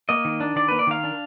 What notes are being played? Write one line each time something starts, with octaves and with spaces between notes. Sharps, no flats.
A#3 D#5
D#3
D4
D#3 D5
A#3 B4
D5
D#3 F5
D4